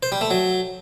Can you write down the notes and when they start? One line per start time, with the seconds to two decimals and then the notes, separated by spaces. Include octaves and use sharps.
0.03 C5
0.12 G3
0.21 A3
0.31 F#3